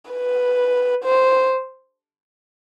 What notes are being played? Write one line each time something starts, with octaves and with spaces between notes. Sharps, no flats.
B4
C5